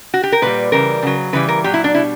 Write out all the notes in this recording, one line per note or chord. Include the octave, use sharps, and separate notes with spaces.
F#4
G4
A#4
A#2 G3 B4
C#3 E3 G3 A#4
C#3 F#3
C#3 E3 G3 B4
A#4
A#2 F#3 G4
E4
D4
B2 G3 E4